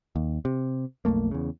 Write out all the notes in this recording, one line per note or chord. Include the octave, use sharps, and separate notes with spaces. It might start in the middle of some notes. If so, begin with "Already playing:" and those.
D#2
C3
B1 F2 A3 A#3
E2 C#3